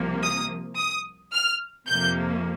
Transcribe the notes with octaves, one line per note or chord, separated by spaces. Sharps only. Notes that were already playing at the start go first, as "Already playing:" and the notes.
Already playing: C2 C3 F3 A#3
D#6
D#6
F6
F2 C3 F3 A#3 G6